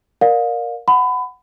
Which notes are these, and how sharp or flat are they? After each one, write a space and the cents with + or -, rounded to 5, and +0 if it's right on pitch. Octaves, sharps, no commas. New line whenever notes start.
A#4 +5 D5 +15 F5 +30
F#5 +0 B5 +25